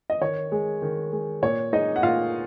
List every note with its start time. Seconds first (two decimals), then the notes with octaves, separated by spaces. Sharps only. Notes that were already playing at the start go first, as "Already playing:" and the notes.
0.10 D#5
0.21 D#3 C#5
0.52 G#3
0.82 D#3
1.12 G#3
1.42 A#2 C#5
1.72 G#3 D#4 D#5
1.96 F#5
2.03 A#2 F4 F5